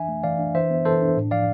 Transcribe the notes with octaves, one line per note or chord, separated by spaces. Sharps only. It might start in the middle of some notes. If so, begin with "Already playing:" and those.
Already playing: E3 D4 E5 G#5
A3
E3 D5 F5
D4
E3 C5 E5
B3
E3 A4 C5
D4
A2
F3 D5 F5